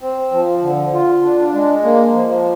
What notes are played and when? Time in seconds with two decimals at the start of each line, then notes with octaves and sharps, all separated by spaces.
0.01 C4
0.32 F3
0.62 D3
0.93 F4
1.24 D4
1.54 G#3
1.84 A#3
2.14 F3